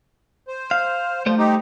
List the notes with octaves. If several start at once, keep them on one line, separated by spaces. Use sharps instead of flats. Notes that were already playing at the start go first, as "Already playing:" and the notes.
C5
F5
F3 G3 A3 C5
D#4 G4